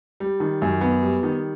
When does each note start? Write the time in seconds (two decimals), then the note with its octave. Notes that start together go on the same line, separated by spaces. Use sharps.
0.20 G3
0.40 D#3
0.62 F#2
0.81 B3
1.02 G3
1.23 D#3